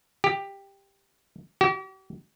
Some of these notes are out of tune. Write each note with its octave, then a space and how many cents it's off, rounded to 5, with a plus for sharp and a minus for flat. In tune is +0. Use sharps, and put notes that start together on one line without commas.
G4 +10
G4 -45